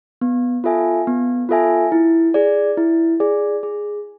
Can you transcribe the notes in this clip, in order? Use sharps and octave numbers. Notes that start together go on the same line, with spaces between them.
B3
F4 A4 E5 G#5
B3
F4 A4 E5 G#5
E4
G#4 D5
E4
G#4 D5
G#4